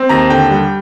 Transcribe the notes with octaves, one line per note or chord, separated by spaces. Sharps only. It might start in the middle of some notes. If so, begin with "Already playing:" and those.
Already playing: C4
D#2 A#5
D3 G5
G3